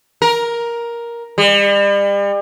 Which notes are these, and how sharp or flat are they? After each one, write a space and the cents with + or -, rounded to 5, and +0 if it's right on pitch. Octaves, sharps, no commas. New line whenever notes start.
A#4 +10
G3 +40